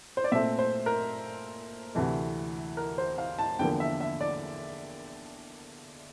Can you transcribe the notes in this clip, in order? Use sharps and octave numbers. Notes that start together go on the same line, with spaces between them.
C5
D5
A#2 A3 C4 E5
C5
A#4
D2 C3 E3 A3
A#4
C5
F5
A5
E2 D3 F3 A#3 G5
E5
E5
D5